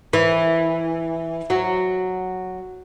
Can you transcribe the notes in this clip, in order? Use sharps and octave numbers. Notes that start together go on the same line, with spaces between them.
E3
F#3